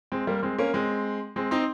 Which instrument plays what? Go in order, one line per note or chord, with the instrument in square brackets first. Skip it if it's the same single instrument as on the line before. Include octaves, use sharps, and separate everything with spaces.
[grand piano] G#3 C4
G3 A#3
G#3 C4
A#3 C#4
G#3 C4
G#3 C4
C4 D#4